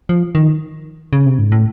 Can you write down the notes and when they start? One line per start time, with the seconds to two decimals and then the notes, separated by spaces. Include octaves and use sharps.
0.09 F3
0.35 D#3
1.13 C#3
1.26 C3
1.39 G#2
1.52 A2